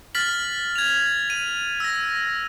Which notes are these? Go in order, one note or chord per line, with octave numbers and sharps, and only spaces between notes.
F6 A6 B6 F#7
G#6 F7
D#7
E6 A#6